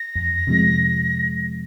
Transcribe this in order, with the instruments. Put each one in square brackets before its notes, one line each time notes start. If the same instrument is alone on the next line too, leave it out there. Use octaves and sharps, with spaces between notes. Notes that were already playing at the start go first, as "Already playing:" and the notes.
Already playing: [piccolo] A#6
[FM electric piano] F2
C3 F3 G#3